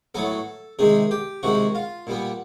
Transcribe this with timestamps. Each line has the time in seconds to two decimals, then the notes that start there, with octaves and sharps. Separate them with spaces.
0.15 A2 F#3 B3 A4
0.79 C3 D#3 G#3 G#4
1.11 G4
1.43 C3 D#3 G#3 F#4
1.75 F4
2.07 A#2 G3 B3